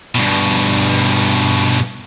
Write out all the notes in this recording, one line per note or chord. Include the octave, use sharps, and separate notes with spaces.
G2 B2